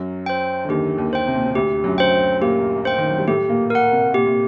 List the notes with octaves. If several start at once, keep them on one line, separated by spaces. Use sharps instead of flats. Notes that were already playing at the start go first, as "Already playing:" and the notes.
Already playing: F#2 F#3
C5 G5
D3
D#2 D#3 G4
D#2 D#3
C5 G5
C3
A#2
C3
D2 D3 G4
F#2 F#3
C5 G5
A#2 A#3 G4
C5 G5
D#3
F#3
G3
A2 A3 G4
A#2 A#3
A#4 F#5
C3
A#2 G4
A#2